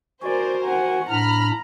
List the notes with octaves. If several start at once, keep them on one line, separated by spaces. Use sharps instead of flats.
F#4 A#4 C5 D5 G#5
F#5 G#5
A2 D4 A#5 B5 F6